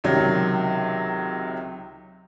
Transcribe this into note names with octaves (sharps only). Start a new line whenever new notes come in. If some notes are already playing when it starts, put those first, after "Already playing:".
C#2 C3 D#3 F#3